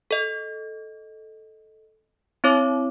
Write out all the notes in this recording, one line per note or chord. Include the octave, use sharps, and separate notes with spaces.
A4 D#5
C4 E4 C#5 D6